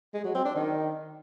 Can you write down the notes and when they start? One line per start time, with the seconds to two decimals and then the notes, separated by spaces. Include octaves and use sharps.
0.14 G#3
0.24 F#3
0.35 C4
0.45 D4
0.55 D#3